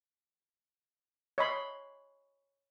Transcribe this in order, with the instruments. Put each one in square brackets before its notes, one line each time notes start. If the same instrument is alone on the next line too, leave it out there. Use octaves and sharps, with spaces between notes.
[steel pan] C#5 D#5 B5 C6